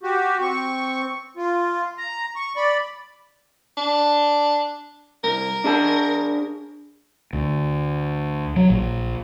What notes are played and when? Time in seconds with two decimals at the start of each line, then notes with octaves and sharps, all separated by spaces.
0.03 F#4 G4
0.41 C4 C#6
1.37 F4
1.98 A#5
2.36 C#6
2.56 D5 B5
3.77 D4
5.24 C2 A#4
5.64 D4 G#4 A5
7.33 D2
8.56 F#3
8.70 A#1